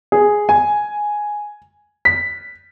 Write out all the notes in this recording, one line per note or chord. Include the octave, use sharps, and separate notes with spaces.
G#4
G#5
B6